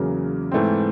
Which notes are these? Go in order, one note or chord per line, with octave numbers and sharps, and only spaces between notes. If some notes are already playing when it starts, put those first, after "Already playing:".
Already playing: E2 C#3 F#3 A#3
G#2 E3 A3 C4